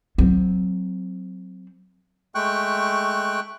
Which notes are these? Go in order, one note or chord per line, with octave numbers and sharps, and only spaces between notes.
F#3 C4
G#3 A3 G5 C#6 F#6